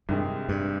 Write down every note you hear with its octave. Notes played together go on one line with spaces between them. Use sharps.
C2 G2 C3 D#3 G#3
G2